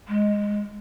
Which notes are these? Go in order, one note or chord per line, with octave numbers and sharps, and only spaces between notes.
G#3